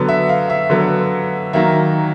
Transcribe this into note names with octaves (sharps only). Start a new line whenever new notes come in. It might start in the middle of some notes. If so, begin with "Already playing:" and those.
Already playing: D3 F#3 B3
E5
F5
E5
D3 F#3 B3
D#3 F#3 A#3 E5